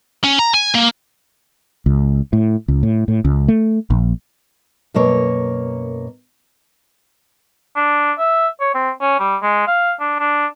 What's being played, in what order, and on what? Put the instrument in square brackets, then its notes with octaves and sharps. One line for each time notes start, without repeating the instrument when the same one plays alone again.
[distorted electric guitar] C#4
A#5
G#5
A#3
[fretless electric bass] C#2
A2
C#2
A2
A2
C#2
A3
A#1
[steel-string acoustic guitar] F#2 B2 A#3 C#5
[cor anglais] D4
E5
C#5
C4
C#4
G3
G#3
F5
D4
D4